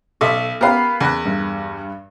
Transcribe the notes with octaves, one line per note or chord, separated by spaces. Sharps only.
B1 A4 E5
B3 G4 A#4 B4 F5 B5
E2 F#6
G2